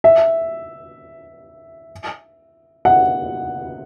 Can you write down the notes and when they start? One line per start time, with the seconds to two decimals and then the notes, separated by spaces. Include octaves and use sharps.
0.04 E5
2.85 F#5